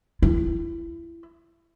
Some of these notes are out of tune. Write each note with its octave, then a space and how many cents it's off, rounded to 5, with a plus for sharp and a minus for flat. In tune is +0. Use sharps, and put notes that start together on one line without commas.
E4 +25